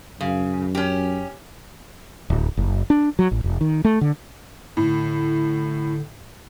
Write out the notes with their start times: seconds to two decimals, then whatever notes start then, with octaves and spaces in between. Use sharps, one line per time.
0.21 F#2 C#3
0.75 C#4 G4
2.30 D1
2.57 F#1
2.90 D4
3.19 F#3
3.31 A1
3.44 F1
3.61 D#3
3.85 A3
4.01 D3
4.77 A2 D3